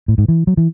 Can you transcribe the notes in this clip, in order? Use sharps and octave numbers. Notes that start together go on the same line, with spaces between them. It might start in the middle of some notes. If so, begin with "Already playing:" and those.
A2
G#2
E3
F#3
E3